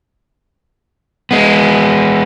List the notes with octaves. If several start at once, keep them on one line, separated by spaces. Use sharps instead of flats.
G#3 B3